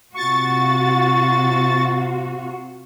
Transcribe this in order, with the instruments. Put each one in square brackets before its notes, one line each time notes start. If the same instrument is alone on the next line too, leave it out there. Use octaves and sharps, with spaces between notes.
[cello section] C3 F4 F#4 [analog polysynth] C#6 A6